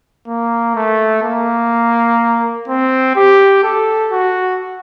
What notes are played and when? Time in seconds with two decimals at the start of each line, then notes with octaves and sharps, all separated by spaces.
0.27 A#3
0.76 A3
1.23 A#3
2.68 C4
3.16 G4
3.64 A4
4.12 F#4